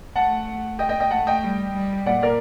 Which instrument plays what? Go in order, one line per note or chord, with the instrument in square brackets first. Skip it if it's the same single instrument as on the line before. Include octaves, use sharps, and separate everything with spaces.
[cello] A3 [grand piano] F#5 A5
[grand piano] D#5 G5
D#5 G5
D#5 G5
[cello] A3 [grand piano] F#5 A5
[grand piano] D#5 G5
[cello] G3
G3
[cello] A#2 [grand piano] D5 F#5
[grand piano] A#4 D5